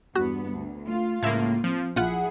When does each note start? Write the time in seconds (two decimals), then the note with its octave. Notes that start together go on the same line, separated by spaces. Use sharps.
0.15 E2 G2 B3 F#4
0.49 D2
0.88 A3 F4
1.23 C#2 A2 A#3 E5 E6 G#6
1.64 F3 C4
1.96 A#1 F3 E4 F4 G#4 F#5 F#6